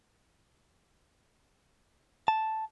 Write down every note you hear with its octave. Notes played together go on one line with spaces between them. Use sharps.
A5